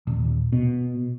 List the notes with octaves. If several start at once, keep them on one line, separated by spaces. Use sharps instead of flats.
D#1
B2